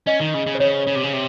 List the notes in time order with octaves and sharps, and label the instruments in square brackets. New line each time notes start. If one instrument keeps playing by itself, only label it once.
[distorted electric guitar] C#4 [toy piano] D#5
[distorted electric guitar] D#3
C#3
C#3
[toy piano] C5
[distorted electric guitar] C#3 [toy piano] C#5
[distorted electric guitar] C#3
C3
C#3
C3